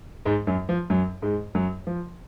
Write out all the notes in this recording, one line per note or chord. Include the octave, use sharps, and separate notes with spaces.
G#2 G#3
F#2 F#3
F3
F#2 F#3
G#2 G#3
F#2 F#3
F3